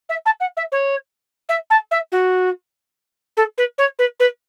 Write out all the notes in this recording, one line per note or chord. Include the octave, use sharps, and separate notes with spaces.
E5
A5
F#5
E5
C#5
E5
A5
E5
F#4
A4
B4
C#5
B4
B4